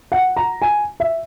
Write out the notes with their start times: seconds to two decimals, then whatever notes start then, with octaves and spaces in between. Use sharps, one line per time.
0.12 F#5
0.37 A#5
0.62 G#5
1.00 E5